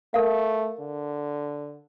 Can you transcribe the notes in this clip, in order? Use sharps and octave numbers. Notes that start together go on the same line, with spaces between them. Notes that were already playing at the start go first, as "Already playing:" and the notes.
A3 A#4 F5
D3